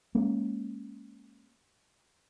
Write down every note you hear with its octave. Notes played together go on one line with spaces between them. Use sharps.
G#3 A#3 C#4